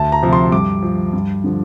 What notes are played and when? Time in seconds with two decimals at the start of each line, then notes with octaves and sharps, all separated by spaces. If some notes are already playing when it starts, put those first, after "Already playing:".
Already playing: D2 A5
0.12 A#5
0.23 C3 F3
0.33 C6
0.52 G2 D6
0.82 F3
1.13 G2
1.44 D3 F3